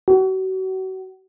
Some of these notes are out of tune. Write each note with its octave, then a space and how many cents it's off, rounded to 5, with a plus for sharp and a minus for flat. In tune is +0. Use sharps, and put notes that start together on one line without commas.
F#4 +35